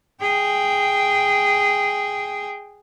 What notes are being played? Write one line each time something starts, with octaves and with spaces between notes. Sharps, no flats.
G#4 G5